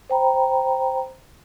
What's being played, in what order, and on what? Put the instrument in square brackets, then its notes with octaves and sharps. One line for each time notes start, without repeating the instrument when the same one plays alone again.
[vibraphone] C5 G5 A#5 B5